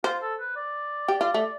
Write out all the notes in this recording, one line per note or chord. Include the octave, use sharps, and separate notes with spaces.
F4 C5
A4
B4
D5
G4
F4
A3